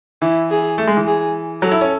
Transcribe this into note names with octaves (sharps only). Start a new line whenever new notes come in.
E3 E4
G#4
A3
G#3
E3
G#4
F#3 A4
E4
C#4